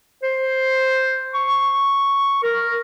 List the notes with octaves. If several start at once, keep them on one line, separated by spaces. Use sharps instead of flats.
C5
C#6
A#4